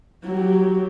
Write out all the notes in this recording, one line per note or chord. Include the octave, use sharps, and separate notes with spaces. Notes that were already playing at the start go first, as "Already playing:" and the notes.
F#3 G4